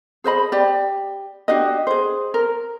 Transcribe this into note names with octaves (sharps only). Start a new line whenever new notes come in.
G#4 C5 D#5 B5
G4 D5
D4 F#4 G4 D#5
G#4 C5
A#4